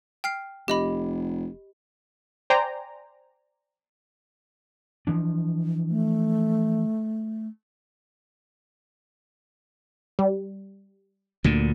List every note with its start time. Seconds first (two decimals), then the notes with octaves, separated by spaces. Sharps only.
0.24 G5 F6 C7
0.68 F1 G4 D#5 B5
2.50 C5 D5 G5 G#5 A#5 C6
5.07 E3 F3 D4
5.90 A3
10.19 G3
11.44 D2 A#2 D3